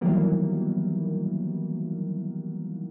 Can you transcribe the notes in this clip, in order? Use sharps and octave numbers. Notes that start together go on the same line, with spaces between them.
D#3 E3 F#3 G3 A#3 B3